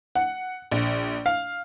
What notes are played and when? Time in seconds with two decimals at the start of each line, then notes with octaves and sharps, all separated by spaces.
0.15 F#5
0.71 A#1
1.26 F5